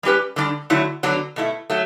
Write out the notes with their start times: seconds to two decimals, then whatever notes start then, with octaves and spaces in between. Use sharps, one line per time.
0.03 G3 C#4 G4 B4
0.36 D3 G3 D4
0.70 D3 F#3 A3 E4
1.03 D3 F#3 B3 D4
1.36 B2 A3 E4
1.70 F#3 A3